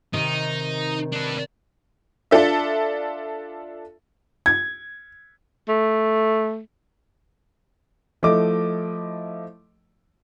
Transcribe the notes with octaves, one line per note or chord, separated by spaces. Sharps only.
C3 D#3 D#4
D4 B4
D4 F4 A4 E5
G#6
A3
F3 A3 E4 D#5 D6